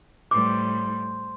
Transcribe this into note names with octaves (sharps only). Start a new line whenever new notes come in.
A2 G3 C5 D6